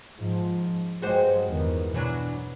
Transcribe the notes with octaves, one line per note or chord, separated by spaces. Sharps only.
G#2 F3
G2 F#3 G#3 F#4 G4 C5
E2 D#3
B2 E3 F#3 D4